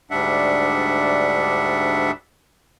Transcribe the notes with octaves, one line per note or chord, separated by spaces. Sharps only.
D2 G#2 G3 D4 E5 F#5